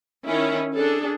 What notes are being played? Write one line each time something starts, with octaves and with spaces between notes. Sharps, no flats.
D#3 C#4 E4
D4 G#4 A4